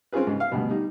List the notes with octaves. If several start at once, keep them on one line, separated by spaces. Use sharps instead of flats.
C4 C#4 F4 G#4 B4
G#2 C#3
F5
D2 G2 B2
G3 D#4